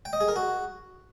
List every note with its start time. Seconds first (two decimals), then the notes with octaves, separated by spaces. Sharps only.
0.05 G5
0.13 D#5
0.21 G#4
0.28 A#4
0.36 F#4